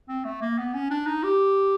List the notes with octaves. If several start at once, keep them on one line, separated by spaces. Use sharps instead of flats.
C4
A3
A#3
B3
C#4
D4
D#4
G4